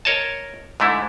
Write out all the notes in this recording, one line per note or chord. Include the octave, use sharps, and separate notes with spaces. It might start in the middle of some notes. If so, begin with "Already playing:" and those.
A#4 C#5 D#5 A5
G#2 D3 A3 E4